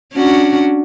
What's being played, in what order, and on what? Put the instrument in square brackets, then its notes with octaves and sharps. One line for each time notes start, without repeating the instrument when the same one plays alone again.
[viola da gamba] C#4 D4 F#4